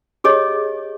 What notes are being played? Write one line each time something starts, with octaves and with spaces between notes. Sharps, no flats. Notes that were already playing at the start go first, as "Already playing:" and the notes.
G4 G#4 C#5 D#5